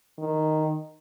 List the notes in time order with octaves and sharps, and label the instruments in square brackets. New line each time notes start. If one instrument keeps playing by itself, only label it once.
[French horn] D#3